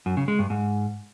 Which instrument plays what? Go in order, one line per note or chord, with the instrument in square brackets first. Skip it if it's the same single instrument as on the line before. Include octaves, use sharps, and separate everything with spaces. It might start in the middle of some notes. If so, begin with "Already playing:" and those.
[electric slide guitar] F#2
C#3
G#3
G2
G#2